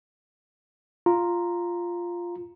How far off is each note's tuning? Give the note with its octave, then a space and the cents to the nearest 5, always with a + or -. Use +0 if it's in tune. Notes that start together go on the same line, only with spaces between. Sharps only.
F4 +0 A#5 +0